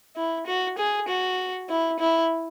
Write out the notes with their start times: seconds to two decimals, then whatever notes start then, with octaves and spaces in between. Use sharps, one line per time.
0.16 E4
0.46 F#4
0.78 G#4
1.08 F#4
1.69 E4
1.99 E4